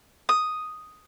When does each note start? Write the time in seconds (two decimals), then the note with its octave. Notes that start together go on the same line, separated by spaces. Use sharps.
0.29 D#6